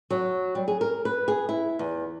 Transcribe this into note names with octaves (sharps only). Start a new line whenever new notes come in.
F#3
G3
G#4
A#4
B4
G#4
E4
E2